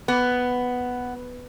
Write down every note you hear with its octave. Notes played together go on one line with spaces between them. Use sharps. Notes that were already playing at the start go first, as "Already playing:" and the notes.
B3